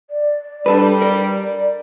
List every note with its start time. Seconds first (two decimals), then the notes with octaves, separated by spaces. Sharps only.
0.10 D5
0.66 G3 D4 A4 B4
1.02 A#4 D5